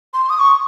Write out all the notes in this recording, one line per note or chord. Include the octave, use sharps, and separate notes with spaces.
C6
D#6
C#6